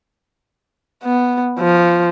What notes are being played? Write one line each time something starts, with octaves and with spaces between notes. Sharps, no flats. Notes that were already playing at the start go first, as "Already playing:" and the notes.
B3
F3